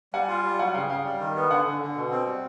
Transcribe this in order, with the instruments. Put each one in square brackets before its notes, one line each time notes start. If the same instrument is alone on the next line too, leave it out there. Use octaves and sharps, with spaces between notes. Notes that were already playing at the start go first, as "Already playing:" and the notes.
[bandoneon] G3 [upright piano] F#5 G#5
[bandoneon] F4
G3
[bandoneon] F#3 [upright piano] F#5 G#5
[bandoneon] C#3 [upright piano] F5 G5
[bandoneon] C#3 [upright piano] F5 G5
[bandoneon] G3
D#3
B3
[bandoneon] D3 [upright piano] F#5 G#5
[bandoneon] D3
D3
B2
C4
G3